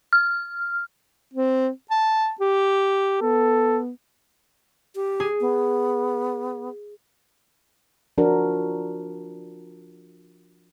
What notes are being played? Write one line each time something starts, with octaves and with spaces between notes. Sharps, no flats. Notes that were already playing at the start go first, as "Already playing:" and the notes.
F6
C4
A5
G4
B3 A4
G4
G#4
B3
F3 D4 F#4 A#4